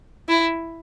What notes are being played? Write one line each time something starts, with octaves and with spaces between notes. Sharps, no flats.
E4